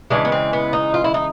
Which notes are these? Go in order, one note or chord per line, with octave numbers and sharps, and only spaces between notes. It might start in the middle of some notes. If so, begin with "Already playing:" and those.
C#3 E3 G#3 D4
B3
C4
B3
D#4
F4
E4
D#4